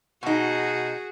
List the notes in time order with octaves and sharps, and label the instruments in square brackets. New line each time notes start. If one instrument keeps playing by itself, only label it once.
[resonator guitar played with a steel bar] B2 D#4 [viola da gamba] F#4 G#4